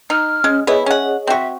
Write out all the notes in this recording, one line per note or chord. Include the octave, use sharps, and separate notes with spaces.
D#4 F6
G#3 C#4
B3 E4 G#4 C#5 D#5 E5
C#4 F#5
C4 F#4 E5